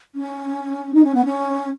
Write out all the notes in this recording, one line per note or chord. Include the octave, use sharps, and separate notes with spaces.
C#4
D#4
C#4
B3
C#4